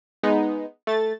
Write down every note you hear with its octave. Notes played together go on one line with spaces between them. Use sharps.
G#3 B3 D#4
A3 A6